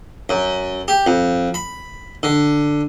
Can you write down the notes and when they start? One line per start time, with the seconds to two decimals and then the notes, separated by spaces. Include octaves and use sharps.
0.29 F#2
0.88 G4
1.07 F2
1.54 B5
2.23 D3